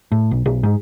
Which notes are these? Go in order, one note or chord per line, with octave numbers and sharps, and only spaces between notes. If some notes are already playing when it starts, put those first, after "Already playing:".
A2
B1
B1
G#2